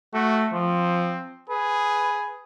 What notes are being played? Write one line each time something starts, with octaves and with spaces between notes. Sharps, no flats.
A3 F#4
F3 C4
G#4 B4